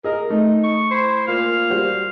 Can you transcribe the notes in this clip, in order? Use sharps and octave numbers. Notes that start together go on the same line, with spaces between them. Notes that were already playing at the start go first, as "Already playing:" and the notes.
G#4 A#4 D#5
A3 D#4
C#6
E4 C5
A#2 F5
G3 F#4 C5